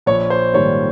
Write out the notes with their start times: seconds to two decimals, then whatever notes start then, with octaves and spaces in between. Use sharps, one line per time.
0.06 A#1 C#5
0.30 C5
0.54 G#2 D#3 G3 A#3 C#5